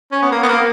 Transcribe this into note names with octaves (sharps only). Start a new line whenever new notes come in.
C#4
B3
A#3
B3
A#3